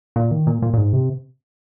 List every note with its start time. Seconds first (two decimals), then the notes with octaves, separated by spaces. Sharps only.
0.16 A#2
0.31 D#3
0.47 A#2
0.62 A#2
0.74 A#2
0.78 G#2
0.93 C3